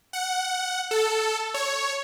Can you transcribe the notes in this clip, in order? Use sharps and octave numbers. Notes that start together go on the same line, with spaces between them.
F#5
A4
C#5